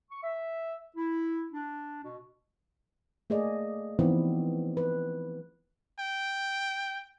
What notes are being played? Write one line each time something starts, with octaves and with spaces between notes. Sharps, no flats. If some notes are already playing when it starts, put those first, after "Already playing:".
C#6
E5
E4
D4
B2
A3 A#3 G#4 D5 D#5
E3 F3 B3 C4 D#4 E4
B4
G5